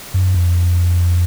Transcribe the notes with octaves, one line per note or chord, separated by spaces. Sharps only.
F#2
F2